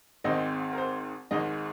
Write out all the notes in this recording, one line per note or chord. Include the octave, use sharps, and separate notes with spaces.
G#1 G#2 G#3 C4 D#5
A#4
C5
G#1 G#2 G#3 D#5